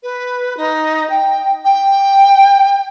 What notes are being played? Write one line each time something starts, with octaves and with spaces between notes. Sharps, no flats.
B4
D#4
G5
G5